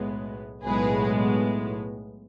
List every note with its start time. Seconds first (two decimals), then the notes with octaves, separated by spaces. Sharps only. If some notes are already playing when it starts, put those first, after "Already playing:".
Already playing: B1 A2 G#3 B3
0.64 B1 A2 G#3 B3 G#4 B4